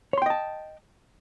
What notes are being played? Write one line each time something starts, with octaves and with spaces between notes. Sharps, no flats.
C#5 D#5 G5 A5 C6